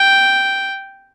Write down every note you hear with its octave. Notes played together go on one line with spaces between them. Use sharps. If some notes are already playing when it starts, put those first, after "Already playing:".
Already playing: G5